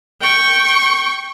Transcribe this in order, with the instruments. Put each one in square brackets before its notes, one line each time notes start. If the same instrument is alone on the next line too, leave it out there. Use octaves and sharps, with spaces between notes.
[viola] G5 C#6